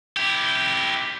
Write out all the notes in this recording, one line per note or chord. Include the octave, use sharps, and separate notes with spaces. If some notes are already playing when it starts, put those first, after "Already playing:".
E4 G4